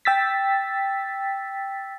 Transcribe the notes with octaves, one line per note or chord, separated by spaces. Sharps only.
G5 E6 A6 B6